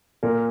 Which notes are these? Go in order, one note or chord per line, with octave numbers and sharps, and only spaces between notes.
A#2 A#4